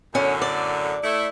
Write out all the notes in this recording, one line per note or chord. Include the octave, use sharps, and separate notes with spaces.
F#2 A2 D3 C#4
D5
A3 E4